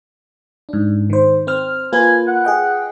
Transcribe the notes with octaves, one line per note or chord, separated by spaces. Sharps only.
G#2 D4
D#3 C5
C4 C5 F6
A#3 F4 B4 G#5
F#5
G#4 D#5 G5